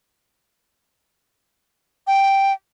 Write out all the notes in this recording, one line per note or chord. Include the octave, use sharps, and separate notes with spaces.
G5